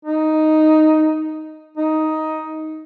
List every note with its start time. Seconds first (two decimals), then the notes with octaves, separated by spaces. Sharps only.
0.05 D#4
1.77 D#4